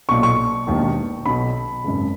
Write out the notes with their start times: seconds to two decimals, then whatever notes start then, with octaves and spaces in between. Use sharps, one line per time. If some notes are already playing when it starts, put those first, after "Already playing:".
0.09 B1 C#6
0.11 A#2
0.23 C#6
0.67 E1 D#2 D#3
1.26 B1 B2 B5
1.84 G#1 F#2 C#3